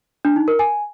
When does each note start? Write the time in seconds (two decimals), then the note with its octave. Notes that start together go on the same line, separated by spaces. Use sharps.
0.25 D4
0.36 D#4
0.48 A#4
0.59 G#5